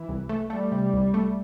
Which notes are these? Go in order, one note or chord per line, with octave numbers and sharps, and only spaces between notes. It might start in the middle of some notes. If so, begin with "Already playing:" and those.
Already playing: E3 E4
C2
A3
G3 A3
C3
C2
A3